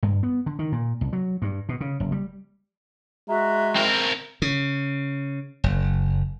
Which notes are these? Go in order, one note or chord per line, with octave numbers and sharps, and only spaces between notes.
G2
B3
D3
D#3
A#2
C2
F#3
G2
B2
C#3
F#1
G3
G#3 F#4 E5 A#5
C4 A#4
C#3
F#1